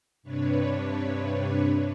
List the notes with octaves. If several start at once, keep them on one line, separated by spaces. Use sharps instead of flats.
G2 C3 D4 B4 C#5